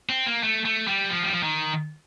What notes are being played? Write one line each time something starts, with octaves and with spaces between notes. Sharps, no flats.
C4
A#3
A3
A3
G3
F3
G3
F3
D#3